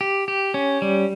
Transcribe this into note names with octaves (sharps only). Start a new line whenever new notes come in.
G4
G4
C#4
G3